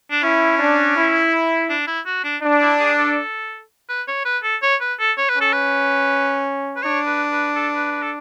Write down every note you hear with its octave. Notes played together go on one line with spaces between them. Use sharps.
D4
C#4 E4
D4
E4
D4
E4
F#4
D4
D4
E4
G#4
A4
B4
C#5
B4
A4
C#5
B4
A4
C#5
B4
C#4
A4
B4
B4
D4 C#5
B4
B4
A4
B4
B4
A4